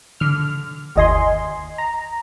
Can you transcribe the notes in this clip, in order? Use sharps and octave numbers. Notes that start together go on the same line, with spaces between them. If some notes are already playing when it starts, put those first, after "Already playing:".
D3 F6
G1 D#2 D#5 G#5 C6
A#5